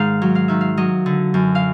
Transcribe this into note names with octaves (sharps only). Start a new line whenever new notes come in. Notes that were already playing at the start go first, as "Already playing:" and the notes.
Already playing: G#2 D#3 F5
F#3
F5
D#3 E5
F5
F#3 D#5
D3
F#2
F5